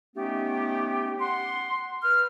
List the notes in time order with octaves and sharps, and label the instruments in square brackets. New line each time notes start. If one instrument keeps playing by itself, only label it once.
[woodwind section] A3 B3 C#4 D#4 G4
F#5 C6
B4 F6